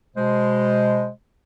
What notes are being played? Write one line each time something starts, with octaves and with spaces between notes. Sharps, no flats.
B2 G#3 C5